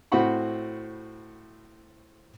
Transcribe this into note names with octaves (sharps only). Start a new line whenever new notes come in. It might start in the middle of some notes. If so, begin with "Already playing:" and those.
A2 C4 F#4 F#5 B5 C#6